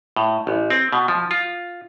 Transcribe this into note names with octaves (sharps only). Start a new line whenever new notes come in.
A2
A1
C4
B2
F3
F4